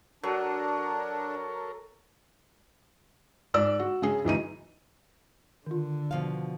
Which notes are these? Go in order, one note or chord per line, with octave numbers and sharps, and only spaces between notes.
F#3 D4 A4 A#4
G#2 D5 E6
F#4
C#3 G#3 G#4
D2 E3 D#4 D#7
D3 D#3 F4
B2 F3 F5